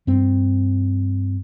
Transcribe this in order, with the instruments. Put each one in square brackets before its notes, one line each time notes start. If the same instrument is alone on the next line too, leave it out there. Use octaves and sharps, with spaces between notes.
[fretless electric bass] G2 C4